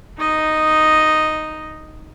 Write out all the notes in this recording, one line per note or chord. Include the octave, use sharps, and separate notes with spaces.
D#4 D#5